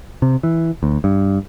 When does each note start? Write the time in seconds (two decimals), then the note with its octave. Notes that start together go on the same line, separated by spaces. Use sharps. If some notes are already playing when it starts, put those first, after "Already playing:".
0.22 C3
0.43 E3
0.83 D2
1.04 G2